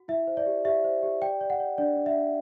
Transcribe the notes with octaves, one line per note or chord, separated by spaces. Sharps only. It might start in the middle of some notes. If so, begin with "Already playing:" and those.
Already playing: F#4
E4 E5
C5
D5
G4
G4 E5
C5
G4
D5 G5
D5
F#5
D5
D4 D5
D4
E5
D4